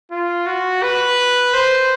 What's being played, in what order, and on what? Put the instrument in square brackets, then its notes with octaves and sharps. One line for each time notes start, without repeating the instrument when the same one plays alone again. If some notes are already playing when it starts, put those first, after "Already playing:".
[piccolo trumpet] F4
F#4
B4
C5